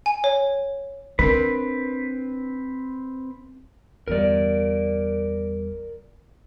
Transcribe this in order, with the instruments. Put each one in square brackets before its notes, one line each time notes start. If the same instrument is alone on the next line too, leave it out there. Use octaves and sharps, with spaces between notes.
[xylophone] G#5
C#5
[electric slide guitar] C4 B4 [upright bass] D4 [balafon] A#4 B5
[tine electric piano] G1 E2 G3 [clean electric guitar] A#4 D5